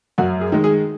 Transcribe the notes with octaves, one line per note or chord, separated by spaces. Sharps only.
F#2 F#4
G#4
D#3 G#3
G#4